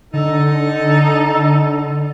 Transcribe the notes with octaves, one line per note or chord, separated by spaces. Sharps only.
D3 D#4 A4